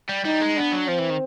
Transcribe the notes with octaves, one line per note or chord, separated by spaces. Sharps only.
G3
G3 D#4
G#3
B3 D4
F#3
F3 C4
E3
D#3